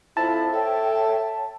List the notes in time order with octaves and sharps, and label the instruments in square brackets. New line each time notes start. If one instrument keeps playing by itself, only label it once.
[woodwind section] F2 [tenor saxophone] E4 [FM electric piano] A5
[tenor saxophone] A4 [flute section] C#5 G5 [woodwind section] E5